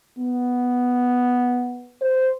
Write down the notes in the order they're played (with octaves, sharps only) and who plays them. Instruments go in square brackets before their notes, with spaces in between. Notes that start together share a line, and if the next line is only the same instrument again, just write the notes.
[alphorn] B3
C5